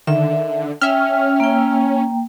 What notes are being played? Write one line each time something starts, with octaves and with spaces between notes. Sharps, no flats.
D3 D#3 E5
C#4 E5 G5 F6
A#3 G5